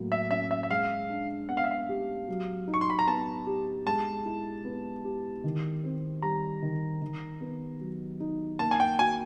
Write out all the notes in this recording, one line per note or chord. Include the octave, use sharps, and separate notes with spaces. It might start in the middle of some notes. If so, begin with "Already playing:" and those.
Already playing: A2 F#3 A#3
E5
C#4 E5
E5
E5
G#3 F5
D4
B3 F#5
F5
E5
F5
G4
F#3
D#4
C#6
C6
B5
A#5
B3 A5
G4
G#3 A5
E4
B3
G4
D#3
C4
G3 A#5
D#3
D#3
B3
F#3
D#4
A#3 A5
G#5
G5
F#4 G#5